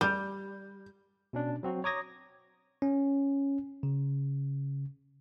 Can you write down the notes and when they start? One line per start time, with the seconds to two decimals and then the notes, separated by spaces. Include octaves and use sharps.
0.01 G3 G6
1.33 B2 C#4 D4
1.63 F#3 C4 F#4
1.84 C#5 A#5 D6 D#6 G#6 A#6
2.82 C#4
3.83 C#3